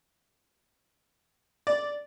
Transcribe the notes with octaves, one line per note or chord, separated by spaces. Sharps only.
D5